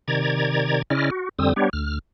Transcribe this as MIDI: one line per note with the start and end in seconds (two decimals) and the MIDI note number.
0.08 0.82 48
0.08 0.82 51
0.08 0.82 74
0.08 0.82 82
0.08 0.82 92
0.90 1.10 49
0.90 1.10 61
0.90 1.10 64
0.90 1.10 74
0.90 1.10 75
0.90 1.10 89
1.11 1.29 66
1.39 1.53 41
1.39 1.53 50
1.39 1.53 55
1.39 1.53 60
1.39 1.53 87
1.39 1.53 88
1.56 1.69 55
1.56 1.69 59
1.56 1.69 62
1.56 1.69 67
1.56 1.69 73
1.73 1.99 38
1.73 1.99 89